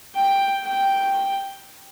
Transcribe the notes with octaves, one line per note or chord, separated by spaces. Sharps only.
G5
G5